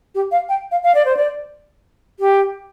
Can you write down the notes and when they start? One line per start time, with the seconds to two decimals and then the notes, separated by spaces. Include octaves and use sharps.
0.15 G4
0.32 F5
0.49 G5
0.71 F5
0.83 F5
0.95 D5
1.05 C5
1.17 D5
2.20 G4